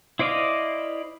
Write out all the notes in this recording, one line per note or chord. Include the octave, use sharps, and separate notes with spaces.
E4 C5 D5 D#5 F5